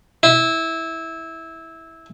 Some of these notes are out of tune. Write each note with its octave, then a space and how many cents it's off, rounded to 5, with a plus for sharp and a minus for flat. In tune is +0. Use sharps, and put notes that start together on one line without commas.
E4 -15